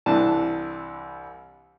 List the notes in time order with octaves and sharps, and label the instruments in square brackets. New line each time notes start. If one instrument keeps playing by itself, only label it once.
[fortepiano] C2 E3 D4 A5